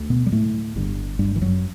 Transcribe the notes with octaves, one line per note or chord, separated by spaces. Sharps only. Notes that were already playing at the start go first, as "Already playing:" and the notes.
Already playing: D2 D3
B2 B3
G3
A2 A3
G1 G2 D3
G2 G3
E3
F#2 F#3